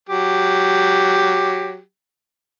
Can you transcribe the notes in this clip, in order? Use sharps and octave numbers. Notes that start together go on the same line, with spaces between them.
F#3 G4